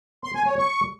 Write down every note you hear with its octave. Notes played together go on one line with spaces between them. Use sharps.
C6
G#5
C#5
C#6